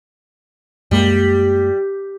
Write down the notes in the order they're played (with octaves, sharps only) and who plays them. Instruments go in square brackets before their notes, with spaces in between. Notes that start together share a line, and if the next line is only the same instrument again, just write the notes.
[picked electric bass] F#2 G#3 A#3 [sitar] G3